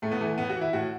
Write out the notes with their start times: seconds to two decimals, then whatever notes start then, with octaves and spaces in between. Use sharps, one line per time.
0.02 A2 A3
0.12 B3
0.21 E3 A3
0.38 A2 B3
0.50 F#4
0.56 E3
0.61 E4
0.73 A2 F#4